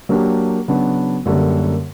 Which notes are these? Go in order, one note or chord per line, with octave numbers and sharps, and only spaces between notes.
F#3 A#3 D4 G4
C#3 F#3 B3 D4 F#4
F#2 D3 G3 A#3